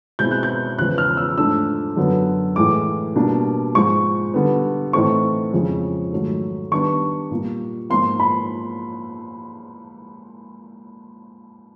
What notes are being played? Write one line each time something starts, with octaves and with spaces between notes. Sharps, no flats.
B2 G#3 C4 E4 G6
F#6
G6
E2 C#3 F3 G#3 B3 F#6
F6
E6
G#2 F3 A3 D4 E6
F#2 D3 F#3 B3
A2 E3 G#3 D6
B2 G3 A#3 D4
G#2 F3 G#3 C#6
D3 G3 B3
A2 E3 A3 C4 D#4 C#6
F2 C#3 F3 G#3
G#2 D#3 F#3 A3
D#3 G3 B3 D4 C#6
A#2 G3 A#3
G#2 F3 A#3 C6
B5